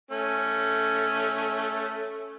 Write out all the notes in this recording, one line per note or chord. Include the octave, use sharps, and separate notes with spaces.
A3 C#4